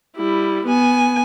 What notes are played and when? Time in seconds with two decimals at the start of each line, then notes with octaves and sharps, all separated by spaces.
0.17 G3 E4
0.66 B3 G#5